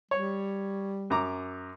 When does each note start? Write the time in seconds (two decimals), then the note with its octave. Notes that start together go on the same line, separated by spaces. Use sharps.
0.11 G3 C#5
1.10 F#2 A#5 D6